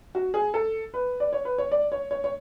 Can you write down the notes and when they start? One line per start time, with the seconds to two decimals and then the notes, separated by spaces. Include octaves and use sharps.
0.15 F#4
0.34 G#4
0.54 A4
0.94 B4
1.20 D5
1.33 C#5
1.45 B4
1.58 C#5
1.72 D5
1.92 C#5
2.11 C#5
2.24 C#5